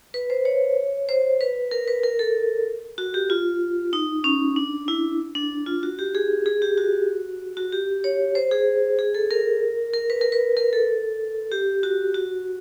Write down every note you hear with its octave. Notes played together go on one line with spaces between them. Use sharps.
B4
C5
C#5
C5
B4
A#4
B4
A#4
A4
F#4
G4
F4
D#4
C#4
D4
E4
D4
F4
F#4
G4
G#4
G#4
G4
F#4
F#4
G4
C#5
C5
G#4
G#4
A4
A#4
A#4
B4
A#4
B4
A#4
A4
G4
F#4
F#4